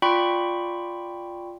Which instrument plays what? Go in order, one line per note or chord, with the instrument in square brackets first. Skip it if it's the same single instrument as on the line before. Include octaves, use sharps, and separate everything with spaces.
[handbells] F4 D5 G5 B5 C#6